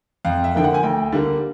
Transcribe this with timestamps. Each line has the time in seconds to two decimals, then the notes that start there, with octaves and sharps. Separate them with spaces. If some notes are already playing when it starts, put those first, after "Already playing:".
0.25 F2 F5
0.44 E5
0.54 D3 F3 A#3 G5
0.64 F#5
0.74 G#5
0.83 D2 G5
1.12 D3 G3 A#3